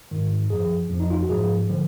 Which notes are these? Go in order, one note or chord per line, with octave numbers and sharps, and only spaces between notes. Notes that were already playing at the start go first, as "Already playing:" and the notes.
G#2 D#3
F#2 F3 G#4
F2 F3
D#4
F4
F#4
G#2 F3 G#4
D3 F3